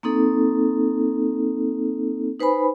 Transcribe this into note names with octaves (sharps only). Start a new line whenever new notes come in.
A#3 C4 D#4 A4
D#4 B4 C5 G#5 B5